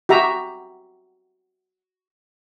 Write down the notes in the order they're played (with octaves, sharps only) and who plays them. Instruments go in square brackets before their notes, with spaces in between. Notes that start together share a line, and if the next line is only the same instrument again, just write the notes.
[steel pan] F#4 G4 E5 A#5